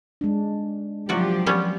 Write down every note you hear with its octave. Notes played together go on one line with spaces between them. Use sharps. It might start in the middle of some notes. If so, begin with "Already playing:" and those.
G#3 D4
C3 F3 F#3 F#4 G4 D5
G3 B3 C#4